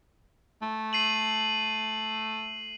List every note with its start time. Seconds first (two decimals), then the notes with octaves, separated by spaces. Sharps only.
0.62 A3
0.93 C7 D#7 F#7